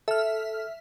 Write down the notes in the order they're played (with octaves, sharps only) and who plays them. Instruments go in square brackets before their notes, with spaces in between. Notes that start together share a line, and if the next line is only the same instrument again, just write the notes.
[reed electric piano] A4 [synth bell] E5 F6